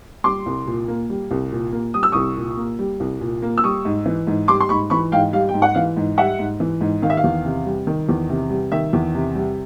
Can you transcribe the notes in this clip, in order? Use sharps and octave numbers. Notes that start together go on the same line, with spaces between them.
G3 C6 D6
C2
A#2
A#3
G3
C2
A#2
A#3
G3 D#6
E6
C2 C#6 D#6
A#2
A#3
G3
C2
A#2
A#3
E6
G3 C#6 D#6
G#2
E3
G#2
G3 C6 D6
C6
G#2 B5 C#6
E3 B5 C#6
G#2 F5 G5
G3 F5
G5
G#2
F#5
E3 F5
G#2
G3 E5 F#5
G#2
E3
G#2
D#3 F5
E5
F5
E2
C3
G3
D#3
E2
C3
G3
D#3 E5
E2
C3
G3